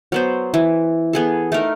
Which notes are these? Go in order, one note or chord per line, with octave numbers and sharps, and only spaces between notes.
F#3 B3 C5
E3
B3 G#4 A4
A3 D#4 A#4